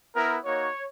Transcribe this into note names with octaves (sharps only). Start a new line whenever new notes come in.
B3 E4 A#4
A#3 D#4 F#4 C#5